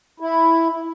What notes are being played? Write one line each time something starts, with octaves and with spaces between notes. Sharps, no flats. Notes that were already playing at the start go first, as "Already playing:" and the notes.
E4